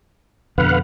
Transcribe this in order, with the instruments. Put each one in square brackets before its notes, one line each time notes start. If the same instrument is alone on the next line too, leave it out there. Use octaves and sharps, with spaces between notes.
[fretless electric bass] F2 B2 D3 [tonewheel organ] B4 F5 F#5